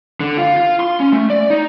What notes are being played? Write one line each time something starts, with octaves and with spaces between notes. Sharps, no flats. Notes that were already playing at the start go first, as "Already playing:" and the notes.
D3
F4
F4
C6
C#4
A3
D5
D#4